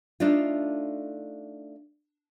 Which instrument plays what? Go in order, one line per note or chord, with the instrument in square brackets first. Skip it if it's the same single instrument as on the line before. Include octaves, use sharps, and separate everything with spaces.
[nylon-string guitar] A3 D4 D#4 F4